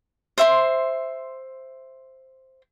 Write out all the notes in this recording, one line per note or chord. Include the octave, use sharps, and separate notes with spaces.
C5 E5 C6